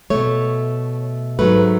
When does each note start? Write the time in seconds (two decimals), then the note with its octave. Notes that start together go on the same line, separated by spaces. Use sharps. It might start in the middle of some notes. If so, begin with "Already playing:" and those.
0.10 B2 A3 C#5
1.39 G#2 F#3 A3 B4